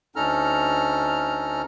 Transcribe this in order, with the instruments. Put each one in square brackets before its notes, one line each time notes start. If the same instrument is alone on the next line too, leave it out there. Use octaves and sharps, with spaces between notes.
[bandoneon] D2 C#4 D#4 A4 A#5 F6